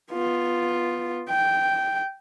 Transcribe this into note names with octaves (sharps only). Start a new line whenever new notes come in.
B3 F4
G5